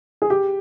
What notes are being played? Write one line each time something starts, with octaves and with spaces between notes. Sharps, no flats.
G#4
G4